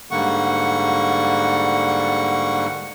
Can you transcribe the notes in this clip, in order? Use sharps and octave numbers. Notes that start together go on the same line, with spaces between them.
G#2 D3 G3 A#3 F#5 C#6